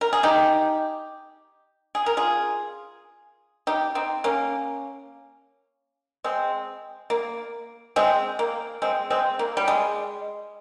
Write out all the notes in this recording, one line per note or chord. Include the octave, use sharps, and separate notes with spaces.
A#4
G#4
D#4 G4
G#4
A#4
F4 G#4
D#4 G4
C4 D#4
A#3 C#4
G#3 C4
A#3
G#3 C4
A#3
G#3 C4
G#3 C4
A#3
G3
G#3